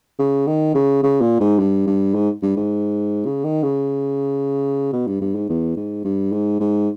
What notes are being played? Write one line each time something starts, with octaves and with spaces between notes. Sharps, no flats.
C#3
D#3
C#3
C#3
A#2
G#2
G2
G2
G#2
G2
G#2
C#3
D#3
C#3
B2
G2
G2
G#2
E2
G#2
G2
G#2
G#2